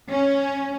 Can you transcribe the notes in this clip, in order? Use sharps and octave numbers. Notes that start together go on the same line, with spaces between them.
C#4